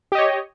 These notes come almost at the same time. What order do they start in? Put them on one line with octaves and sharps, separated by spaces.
G4 D#5 C#5